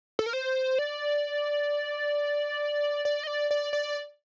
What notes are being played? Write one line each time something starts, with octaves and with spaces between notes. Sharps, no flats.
A4
A#4
C5
D5
D5
D#5
D5
D5
D5